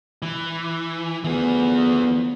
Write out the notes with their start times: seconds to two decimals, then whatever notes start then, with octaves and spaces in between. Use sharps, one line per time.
0.22 E3
1.24 D2 E3 F3 B3 G#4